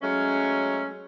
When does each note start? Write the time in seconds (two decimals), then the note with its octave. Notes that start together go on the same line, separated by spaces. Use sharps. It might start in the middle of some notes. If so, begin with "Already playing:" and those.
0.02 F#3 G#3 A3 C#4